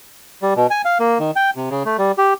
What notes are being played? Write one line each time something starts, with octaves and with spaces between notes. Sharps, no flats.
G3
B2
G#5
F5
A#3
D#3
G5
C3
C#3
A3
G3
G4